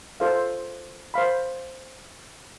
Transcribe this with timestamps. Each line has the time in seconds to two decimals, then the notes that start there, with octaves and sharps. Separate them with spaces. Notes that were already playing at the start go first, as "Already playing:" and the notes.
0.20 F4 A4 C5 F5
1.14 C5 F5 B5